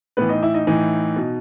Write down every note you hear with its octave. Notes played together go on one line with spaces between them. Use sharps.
A2 E3 B3 B4
D#4 D#5
E4 E5
D#4 D#5
A2 E3 D#4 D#5
B2